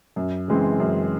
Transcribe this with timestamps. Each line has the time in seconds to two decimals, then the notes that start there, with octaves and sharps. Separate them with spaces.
0.16 F#2
0.48 C#3 E3 G#3 C4
0.80 F#2